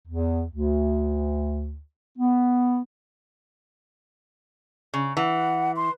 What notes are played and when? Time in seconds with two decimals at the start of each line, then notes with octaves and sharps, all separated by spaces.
0.07 E2
0.51 D2
2.17 B3
4.94 C#3
5.17 E3 F#5
5.76 C6